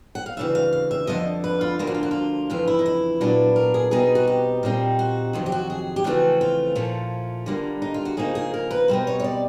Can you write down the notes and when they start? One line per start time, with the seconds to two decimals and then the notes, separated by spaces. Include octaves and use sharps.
0.15 F#5
0.26 F5
0.37 D2 C#3 E3 E5
0.55 F5
0.73 F5
0.91 E5
1.07 F2 D3 F3 D#5
1.44 B4
1.61 F4
1.79 D2 D3 F3 A#3 F4
1.87 F#4
1.94 F4
2.03 F#4
2.11 F4
2.50 F2 C#3 E3 F4
2.67 E4
2.79 D#4
2.86 E4
3.21 A#2 F#3 B3 D4
3.56 A#4
3.74 G#4
3.91 B2 G3 C4 D#4 G#4
4.15 F#4
4.27 G4
4.63 A#2 G3 C4 D#4
4.99 F#4
5.33 F2 C3 D#3 F#3
5.46 G4
5.52 F#4
5.70 G#4
5.96 G4
6.04 F2 C#3 E3 A3 C4 F#4
6.41 F4
6.75 A#2 F3 A3 C#4
7.46 D3 G3 A#3
7.82 D#4
7.94 F4
8.05 F#4
8.17 C#3 F3 A#3 D#4 G#4
8.35 G#4
8.54 A#4
8.71 B4
8.88 B2 G3 C4 D#4 C5
9.07 C#5
9.20 C#5
9.24 D5